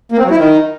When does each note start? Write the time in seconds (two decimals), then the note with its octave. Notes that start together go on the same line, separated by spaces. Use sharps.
0.12 A#3
0.18 C4
0.25 F#3
0.31 E4
0.37 D#3